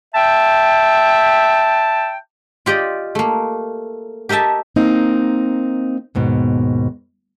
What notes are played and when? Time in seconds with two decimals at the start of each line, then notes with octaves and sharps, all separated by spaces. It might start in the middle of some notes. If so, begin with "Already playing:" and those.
0.15 E5 G5 A5
2.66 F4 G4 D5 D#5
3.15 A3 A#3
4.29 G4 A#4 D#5 E5 A5
4.76 A#3 C4 D#4
6.15 D#2 G#2 B2